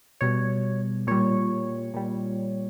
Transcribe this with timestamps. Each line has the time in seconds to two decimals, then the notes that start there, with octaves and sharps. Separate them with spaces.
0.21 B2 G3 C#5
1.07 A#2 G3 C#5
1.94 A#2 G3